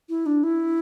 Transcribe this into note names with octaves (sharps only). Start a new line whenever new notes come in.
E4
D4
E4